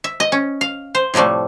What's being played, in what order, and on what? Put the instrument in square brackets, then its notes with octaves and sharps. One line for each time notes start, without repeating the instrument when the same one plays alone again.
[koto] E5
D#5
C#4
F5
C5
A2 C3 F3 G3 A3